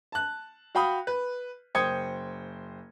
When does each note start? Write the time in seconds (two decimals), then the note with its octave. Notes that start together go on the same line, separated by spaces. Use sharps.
0.12 A5 F#6
0.75 F#4 F5 G5 B5 D#6
1.07 B4
1.75 F#1 C5 G5 D#6 G#6 C#7